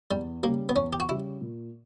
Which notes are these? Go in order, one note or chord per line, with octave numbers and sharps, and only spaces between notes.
E2 G3
C#3 G3 A#3
B3
E2 C#4
G4
F#4
C#3 G3 E4
A#2